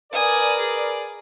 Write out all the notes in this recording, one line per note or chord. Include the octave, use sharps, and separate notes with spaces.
A#4 B4 D5 G#5 D#6
G#4